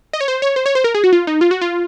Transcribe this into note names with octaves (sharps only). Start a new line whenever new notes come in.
D#5
C#5
C5
C#5
C5
C#5
C5
A#4
G#4
F#4
F4
D#4
F4
F#4
F4